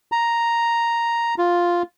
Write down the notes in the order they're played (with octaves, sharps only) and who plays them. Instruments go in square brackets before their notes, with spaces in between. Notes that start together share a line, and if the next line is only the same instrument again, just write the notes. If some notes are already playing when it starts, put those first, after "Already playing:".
[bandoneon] A#5
F4